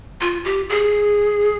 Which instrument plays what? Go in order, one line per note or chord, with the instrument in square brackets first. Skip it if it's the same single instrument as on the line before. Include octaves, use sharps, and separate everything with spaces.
[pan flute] F4
G4
G#4